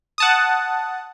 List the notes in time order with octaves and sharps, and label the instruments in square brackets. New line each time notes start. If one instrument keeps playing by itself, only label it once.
[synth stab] F#5 A5 D#6